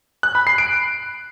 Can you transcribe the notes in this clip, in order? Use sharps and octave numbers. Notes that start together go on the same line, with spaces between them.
F#6
B5
C7
D7